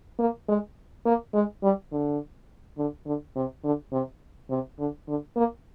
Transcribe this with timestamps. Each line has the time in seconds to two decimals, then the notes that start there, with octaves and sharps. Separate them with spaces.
0.19 A#3
0.48 G#3
1.06 A#3
1.34 G#3
1.63 G3
1.92 D3
2.78 D3
3.06 D3
3.36 C3
3.64 D3
3.92 C3
4.50 C3
4.79 D3
5.08 D3
5.37 A#3